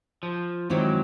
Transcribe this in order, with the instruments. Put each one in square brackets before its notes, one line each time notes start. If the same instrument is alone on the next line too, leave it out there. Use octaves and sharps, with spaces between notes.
[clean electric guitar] F3
[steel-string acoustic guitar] D#3 G#3 C4 E4 G4 [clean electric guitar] F#3